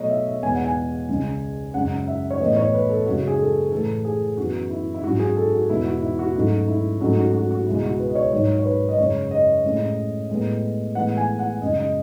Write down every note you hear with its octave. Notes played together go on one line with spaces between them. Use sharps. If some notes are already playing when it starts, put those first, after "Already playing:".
Already playing: B2 F#3 A3 C#5 D#5
E5
E5
E2 B2 G#3 B3 G#5
F#5
G#5
C#2 C#3 G#3 C#4
F#2 C#3 G#3 C#4 F#5
E5
C#5
A2 E3 B3 D#5
C#5
B4
A4
F#2 C#3 G#3 F#4
G#4
A4
A2 E3 A3 A4
G#4
F#2 E3 B3 F#4
E4
E4
G#2 F#3 C#4 F#4
G#4
A4
F#4
E2 B2 G#3 B3 E4
F#4
E4
F#4
G#2 F#3 A3 C#4 F#4
E4
G#2 F#3 A3 C#4 F#4
F#4
F#4
F#4
C#2 B2 G#3 E4
F#4
B4
D#5
C#5
G#2 D#3 F#3 C#5
C#5
B4
D#5
F#2 C#3 G#3 C#5
D#5
A2 G#3 C#4
A2 G#3 B3
A2 E3 G#3 B3 F#5
G#5
F#5
F#2 C#3 G#3 D#5
D#5